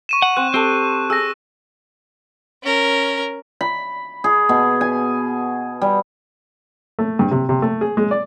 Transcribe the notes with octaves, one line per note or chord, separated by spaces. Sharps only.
C#6 D#7 E7
F#5
C4 F#6
C4 G4 A4
G#4 E6 A#6
C#4 A#4
B5
G#4
B2
G#5
G3
A3
G2
C3
C3
A3
G#4
G#3
D5